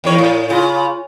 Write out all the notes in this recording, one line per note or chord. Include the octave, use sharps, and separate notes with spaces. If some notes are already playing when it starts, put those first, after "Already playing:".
E2 D#3 C#5
A2
C#3 F4